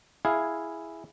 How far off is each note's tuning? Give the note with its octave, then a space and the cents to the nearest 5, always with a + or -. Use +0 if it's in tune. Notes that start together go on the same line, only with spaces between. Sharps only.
E4 +0 G#4 +0 F5 +0